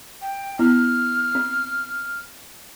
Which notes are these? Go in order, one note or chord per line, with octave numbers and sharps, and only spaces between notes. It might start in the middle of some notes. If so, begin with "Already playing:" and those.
G5
B3 E4 F6
C4